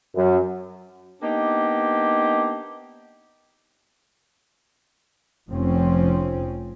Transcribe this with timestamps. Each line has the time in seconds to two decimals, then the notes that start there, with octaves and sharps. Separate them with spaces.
0.15 F#2
1.21 A#3 B3 D4 D#4 G4
5.50 F1 F3 C4 C#4